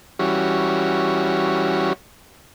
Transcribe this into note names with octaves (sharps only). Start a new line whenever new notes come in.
E3 G3 C#4 F#4